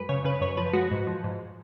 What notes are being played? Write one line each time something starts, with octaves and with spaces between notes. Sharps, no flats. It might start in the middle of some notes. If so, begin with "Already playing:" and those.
Already playing: F#2 G#3 B4
C#3 C#5
C#3 B4
F#2 C#5
F3 B4
G#3 F#4
G#2
F3
G#2